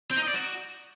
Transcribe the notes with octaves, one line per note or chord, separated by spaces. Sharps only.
C4
D#4
D#5
D5
F#4